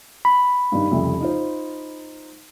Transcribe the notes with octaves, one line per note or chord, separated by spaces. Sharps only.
B5
G2 D#3
C2 F2 C#3
D#4 F4 C5